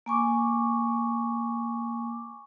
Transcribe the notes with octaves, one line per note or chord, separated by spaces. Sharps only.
A#3 G#5 C#6 D6